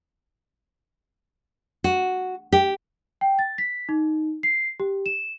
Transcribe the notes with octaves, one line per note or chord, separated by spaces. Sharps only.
F#4
G4
G5
A6
B6
D#4
C7
G4
E7